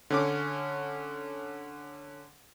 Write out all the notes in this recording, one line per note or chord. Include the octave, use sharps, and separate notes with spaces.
D3 C#4 D6